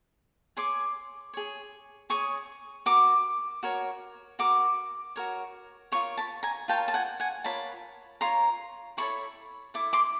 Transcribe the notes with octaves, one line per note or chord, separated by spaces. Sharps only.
G#4 C#5 C6 D6
G#4 C#5
G#4 C#5 C#6 D#6
F#4 A#4 D6
F#4 A#4 C#5
F#4 A#4 D6
F#4 A#4 C#5
F4 A#4 C#5 C#6
A5 B5
G#5 A#5
F4 A#4 C#5 G5 A5
A5
F#5 G#5
F#5 G#5
F4 A#4 C#5 A5 B5
F4 A#4 C#5 A#5 C6
E4 A4 C#5 B5 C#6
E4 A4 D6
C6 D6